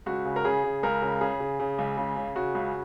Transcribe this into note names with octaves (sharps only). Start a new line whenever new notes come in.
C#2 F#4
C#3
A#4
C#3 G#4
C#3
C#2 A#4
C#3
C#3 G#4
C#3
C#3
C#2
C#3
C#3
C#3 F#4
C#2